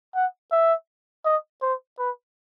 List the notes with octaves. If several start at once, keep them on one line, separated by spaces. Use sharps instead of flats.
F#5
E5
D#5
C5
B4